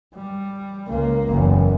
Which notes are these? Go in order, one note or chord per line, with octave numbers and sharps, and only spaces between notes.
G3
C#2 A#3
F#1 E2